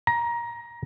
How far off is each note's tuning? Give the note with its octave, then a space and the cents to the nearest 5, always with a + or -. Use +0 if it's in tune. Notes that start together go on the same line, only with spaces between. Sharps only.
A#5 +20